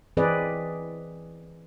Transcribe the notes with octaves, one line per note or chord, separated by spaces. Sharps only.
E3 C4 G#4 B4 D5 D#5